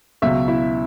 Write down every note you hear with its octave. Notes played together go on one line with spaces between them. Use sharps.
C#2 B2 F#3 E5
E4